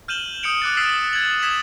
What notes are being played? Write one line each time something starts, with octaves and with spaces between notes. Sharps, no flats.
F6 G6 D#7 E7 F#7 G7
D#6 G6 C#7 D7 F7
D6 F#6 A6
E6 F6 A6 B6 C7 D7
G#6 F#7
D#6 G#6 B6 E7